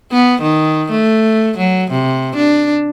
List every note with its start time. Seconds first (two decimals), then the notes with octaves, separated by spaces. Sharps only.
0.12 B3
0.42 D#3
0.91 A3
1.58 F#3
1.91 C3
2.36 D4